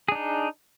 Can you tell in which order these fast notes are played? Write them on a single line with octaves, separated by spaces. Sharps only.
G#4 D4 D#4